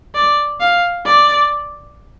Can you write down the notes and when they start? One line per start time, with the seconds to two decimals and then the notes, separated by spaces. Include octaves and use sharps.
0.15 D5
0.61 F5
1.06 D5